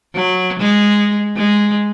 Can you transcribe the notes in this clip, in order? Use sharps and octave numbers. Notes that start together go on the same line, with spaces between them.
F#3
G#3
G#3